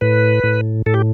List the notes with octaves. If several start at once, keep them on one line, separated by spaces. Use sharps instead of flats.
A2 B4
A2
A2 A4
G4